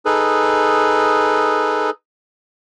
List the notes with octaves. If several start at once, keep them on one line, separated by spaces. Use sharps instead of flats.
D#4 G#4 A4 B4